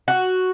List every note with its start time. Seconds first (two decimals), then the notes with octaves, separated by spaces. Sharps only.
0.08 F#4